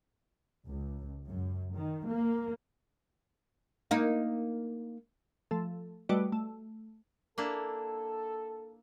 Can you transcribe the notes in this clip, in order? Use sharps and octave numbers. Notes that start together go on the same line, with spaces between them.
C#2
F#2
D#3
A#3
A#3 D#4
F3 A3 A4
G3 A3 F#4 B4 D5 D#5
A3
A#3 D4 E4 A4